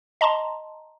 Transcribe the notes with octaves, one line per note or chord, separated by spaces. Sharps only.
D#5 A5 A#5 C6